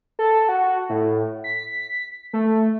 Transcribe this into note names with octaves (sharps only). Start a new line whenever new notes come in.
A4
F#4
A2
B6
A3